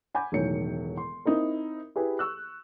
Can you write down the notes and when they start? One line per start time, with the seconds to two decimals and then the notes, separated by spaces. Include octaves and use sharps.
0.14 F#5 G#5 B5 D6 G6
0.32 E1 A2 D#3 F#3 C#7
0.97 C6
1.25 C4 D#4 E4 A#4
1.96 E4 G4 G#4 B4
2.19 C#6 E6 F#6